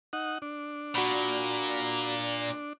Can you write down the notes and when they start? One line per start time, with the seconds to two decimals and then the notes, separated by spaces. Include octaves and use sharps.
0.13 D#4 F#5
0.42 D4
0.95 A#2 F#4 B5